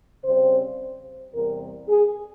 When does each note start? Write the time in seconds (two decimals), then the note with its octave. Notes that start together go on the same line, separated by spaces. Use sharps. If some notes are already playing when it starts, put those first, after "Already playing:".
0.25 C#3 G3 C4 C5
1.34 E2 C3 G3 A#4
1.89 G#4